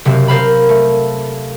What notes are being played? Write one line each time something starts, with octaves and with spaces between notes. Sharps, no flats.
F#1 C3 C4
A#4 C5 F5 B5
A3